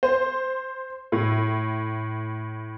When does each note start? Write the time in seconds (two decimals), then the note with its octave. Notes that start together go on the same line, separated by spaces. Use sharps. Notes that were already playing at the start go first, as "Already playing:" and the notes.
0.03 C5
1.12 A2